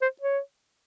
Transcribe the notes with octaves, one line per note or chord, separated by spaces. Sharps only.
C5
C#5